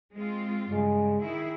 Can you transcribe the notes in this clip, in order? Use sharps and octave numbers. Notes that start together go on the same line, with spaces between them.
G#3 C4 F4
G2 C#3 G#3
D#3 E4 G#4